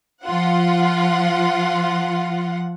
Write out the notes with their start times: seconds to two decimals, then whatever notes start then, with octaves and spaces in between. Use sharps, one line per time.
0.23 F3 F4 F#5